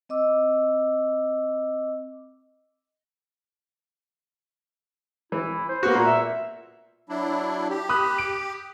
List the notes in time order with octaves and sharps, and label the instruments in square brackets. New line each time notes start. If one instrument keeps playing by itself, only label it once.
[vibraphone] C4 D#5 D6 E6
[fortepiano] E3 [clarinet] E4
[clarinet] C5
[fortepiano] A#3 B3 F#4
A#2
[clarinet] E5
[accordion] F#3 D4 E4
G4
[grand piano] B5 D#6 F#6
D7